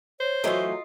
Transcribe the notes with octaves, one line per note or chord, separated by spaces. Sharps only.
C5 C#5
E3 F#3 A3 F4 D#5